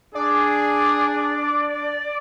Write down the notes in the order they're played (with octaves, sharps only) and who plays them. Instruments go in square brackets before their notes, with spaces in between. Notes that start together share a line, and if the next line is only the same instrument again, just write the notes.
[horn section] D4 [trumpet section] G#4 [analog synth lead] D5